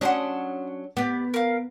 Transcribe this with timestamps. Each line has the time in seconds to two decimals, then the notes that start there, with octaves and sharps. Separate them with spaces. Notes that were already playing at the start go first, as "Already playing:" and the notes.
0.01 F#3 C#4 D4 F#5 C6 D#6
0.97 B3 G4 D5
1.34 A#4 F5